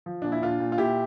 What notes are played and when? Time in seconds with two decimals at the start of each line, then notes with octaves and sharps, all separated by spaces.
0.06 F3
0.22 A#2 D4
0.32 E4
0.42 A#2 D4 F4
0.60 A#2
0.72 F4
0.78 A#2 E4 G4